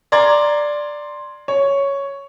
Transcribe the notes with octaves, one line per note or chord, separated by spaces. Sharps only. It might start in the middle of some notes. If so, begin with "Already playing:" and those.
D5 A#5 C6 G#6
C#5